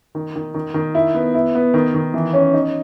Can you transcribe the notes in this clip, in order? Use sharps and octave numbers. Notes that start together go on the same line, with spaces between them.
D#3
D#3
D#3
D#3
E4
B3
E4
B3
D#3
D#3
E3
C#4
D#4